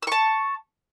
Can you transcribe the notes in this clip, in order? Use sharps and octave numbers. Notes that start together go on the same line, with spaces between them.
A5 C#6 E6